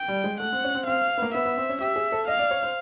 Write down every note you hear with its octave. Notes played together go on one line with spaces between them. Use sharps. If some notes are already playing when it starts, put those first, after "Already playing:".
Already playing: G5
G3
G#3
A3 F#5
C4
C#4
C4
C4 F5
B3
A#3
B3 E5
B3
C4
C#4
G4 E5
G#4
A4
D#5 F5
D5
C#5
C5